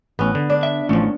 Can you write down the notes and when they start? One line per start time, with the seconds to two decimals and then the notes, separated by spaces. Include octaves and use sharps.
0.19 A1 B3 C#4
0.35 D3
0.50 D4
0.63 E5
0.89 A1 F3 A3 C#4